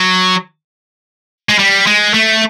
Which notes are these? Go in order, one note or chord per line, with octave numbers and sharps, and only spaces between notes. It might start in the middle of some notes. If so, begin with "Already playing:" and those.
Already playing: F#3
G#3
G3
G#3
A3